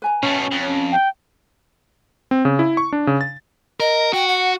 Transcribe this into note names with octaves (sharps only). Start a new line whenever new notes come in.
B4 G#5 A#5
B2 A3 C#4
F2 B4
G5
C4
C#3
E4
C#6
D4
C#3
A6
A#4 D#5
F#4 G5
F#5